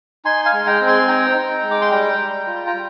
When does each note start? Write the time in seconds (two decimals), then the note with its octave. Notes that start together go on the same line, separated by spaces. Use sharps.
0.25 D#4 G#5 C6
0.45 F5 G#5
0.53 G#3
0.66 G5 A#5
0.81 C4
0.87 G#5 C6
1.08 D#4 G5 A#5
1.35 D#4
1.63 G#3
1.71 D6
1.81 C6
1.91 G3 G5 A#5
2.19 G3
2.47 F4
2.67 A#5
2.74 G3